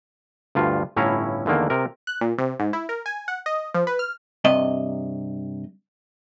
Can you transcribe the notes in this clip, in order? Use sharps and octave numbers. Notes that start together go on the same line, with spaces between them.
D2 G2 F4
G1 A2 C#4 E4 F5 A#5
E2 D3 D#3 A#3
C3 A#4
F#6
A#2
C3
G#2
E4
A#4
G#5
F#5
D#5
F3
B4
F6
G2 C3 D#5